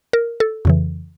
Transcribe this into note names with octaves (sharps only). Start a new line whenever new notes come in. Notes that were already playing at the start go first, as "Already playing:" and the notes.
A#4
A4
F2 C#3 E3